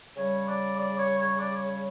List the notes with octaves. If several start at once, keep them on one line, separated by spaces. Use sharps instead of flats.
C#3 G3 C#5
D5
D5
C#5
C#5
D5
C#5
C#5